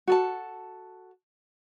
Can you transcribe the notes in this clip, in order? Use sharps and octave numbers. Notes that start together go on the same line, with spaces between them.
F#4 A4 A5